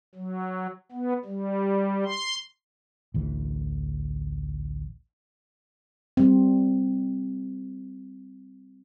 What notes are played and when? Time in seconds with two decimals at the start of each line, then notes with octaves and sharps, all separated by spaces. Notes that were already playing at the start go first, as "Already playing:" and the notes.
0.15 F#3
0.92 B3
1.25 G3
2.05 C6
3.14 A1 D2 E3
6.17 G3 C4